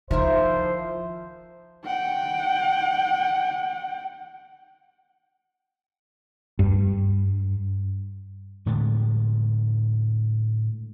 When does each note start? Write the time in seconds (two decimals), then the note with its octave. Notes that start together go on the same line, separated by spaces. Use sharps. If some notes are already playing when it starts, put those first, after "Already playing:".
0.11 D#3 F3 E4 A#4 C5 E5
1.86 F#5 G5
6.59 G2
8.66 A2 D3 G#3 A3